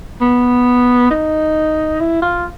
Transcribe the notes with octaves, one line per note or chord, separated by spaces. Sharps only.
B3
D#4
E4
F4